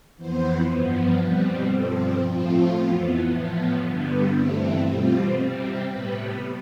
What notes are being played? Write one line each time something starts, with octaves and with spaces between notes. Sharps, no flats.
F2 E3 B3 C5
G2 F3 B3
B2 G3 C4 B4
G2 F3 C4 A4
A2 F3 A3 C4 F4
F2 E3 B3
A2 F3 B3
G2 D3 G3 B3
G2 E3 A3 C4 G4
B2 G3 C4 F4
C3 G3 C4
A2 G3 B3 B4